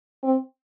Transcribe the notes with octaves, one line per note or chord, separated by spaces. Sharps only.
C4